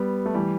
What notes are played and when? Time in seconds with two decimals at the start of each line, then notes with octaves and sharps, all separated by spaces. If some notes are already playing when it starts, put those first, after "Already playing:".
Already playing: G3 B3
0.26 A3
0.34 E3 G3